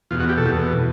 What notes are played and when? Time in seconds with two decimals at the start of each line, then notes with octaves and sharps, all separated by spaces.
0.11 E2 B2 F4
0.20 F#4
0.29 G4
0.37 A4
0.45 E2 B2